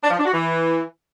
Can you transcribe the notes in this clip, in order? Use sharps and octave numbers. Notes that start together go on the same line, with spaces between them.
D4
F3
D4
F#4
E3